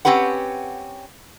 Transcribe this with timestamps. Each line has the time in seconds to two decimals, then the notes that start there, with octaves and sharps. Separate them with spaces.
0.05 C4 C#4 G4 B4 F#5